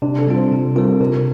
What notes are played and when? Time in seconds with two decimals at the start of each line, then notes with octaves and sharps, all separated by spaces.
0.02 C3 D4
0.19 A4
0.27 G3 C4 F4
0.36 C5
0.51 C3
0.75 G3 C4 F4 A#4
1.00 C3 A#4